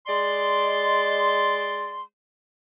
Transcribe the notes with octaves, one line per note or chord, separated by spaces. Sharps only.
G#3 D5 C6